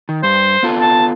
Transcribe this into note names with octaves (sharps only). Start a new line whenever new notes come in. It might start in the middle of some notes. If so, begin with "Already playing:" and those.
D#3
G2 C5
B3 F4 A4
A5